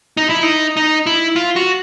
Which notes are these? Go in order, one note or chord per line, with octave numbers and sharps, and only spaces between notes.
D#4
E4
D#4
D#4
E4
F4
F#4